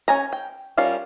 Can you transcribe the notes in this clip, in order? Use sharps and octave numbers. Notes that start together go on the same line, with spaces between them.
C#4 G#5 A#5
G5
G3 C#4 F4 A#4 F5